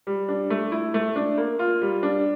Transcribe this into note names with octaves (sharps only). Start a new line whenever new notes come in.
G3
D4
A3
E4
A3
D4
A#3
F4
G3
D4